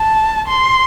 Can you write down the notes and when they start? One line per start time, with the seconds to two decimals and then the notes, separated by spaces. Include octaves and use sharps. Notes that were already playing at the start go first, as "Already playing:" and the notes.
Already playing: A5
0.48 C6